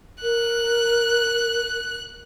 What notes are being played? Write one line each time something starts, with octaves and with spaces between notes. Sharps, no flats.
A#4 F#6